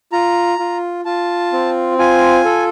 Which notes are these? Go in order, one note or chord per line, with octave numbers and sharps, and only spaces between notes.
F4 A#5
F4
F4 A5
C4
F4 G#5
A4